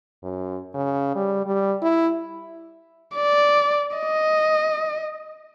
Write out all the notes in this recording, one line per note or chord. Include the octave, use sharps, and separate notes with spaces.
F#2
C#3
G3
G3
E4
D5
D#5